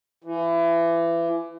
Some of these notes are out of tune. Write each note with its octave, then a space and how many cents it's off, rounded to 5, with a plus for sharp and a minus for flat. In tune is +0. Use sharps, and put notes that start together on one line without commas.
E3 +30